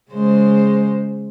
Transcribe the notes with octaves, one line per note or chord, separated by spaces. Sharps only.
C#3 G#3 C5